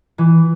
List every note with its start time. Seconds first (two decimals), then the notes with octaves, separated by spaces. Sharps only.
0.18 E3